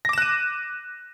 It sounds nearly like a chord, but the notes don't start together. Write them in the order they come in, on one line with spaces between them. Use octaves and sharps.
A#6 D6 E7 F#6 D#7